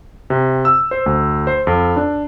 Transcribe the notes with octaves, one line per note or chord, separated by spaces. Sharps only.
C3
E6
C5
D2
C5
F2
D4